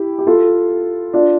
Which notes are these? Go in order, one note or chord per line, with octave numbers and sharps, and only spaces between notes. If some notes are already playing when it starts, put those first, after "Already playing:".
Already playing: E4 G4
G4
F4 A4
D4 F4